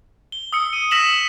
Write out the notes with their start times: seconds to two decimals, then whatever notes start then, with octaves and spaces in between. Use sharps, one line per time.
0.32 G7
0.53 D#6 E6 C#7
0.73 D#7
0.91 E6 A#6 B6 E7 F#7